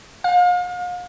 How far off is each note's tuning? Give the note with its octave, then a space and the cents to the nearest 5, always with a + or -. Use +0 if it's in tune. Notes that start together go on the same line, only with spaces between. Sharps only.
F5 +40